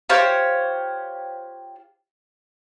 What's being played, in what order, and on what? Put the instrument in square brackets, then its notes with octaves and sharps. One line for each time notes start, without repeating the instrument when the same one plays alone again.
[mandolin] F4 G4 C5 C#5